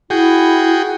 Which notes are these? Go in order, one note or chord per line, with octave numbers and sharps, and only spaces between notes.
E4 F#4 G#4 G5